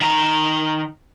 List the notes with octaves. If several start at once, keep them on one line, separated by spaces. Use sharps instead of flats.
D#3 A#5